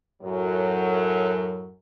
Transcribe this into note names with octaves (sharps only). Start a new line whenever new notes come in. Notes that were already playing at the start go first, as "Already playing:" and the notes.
F#2 A2 F#3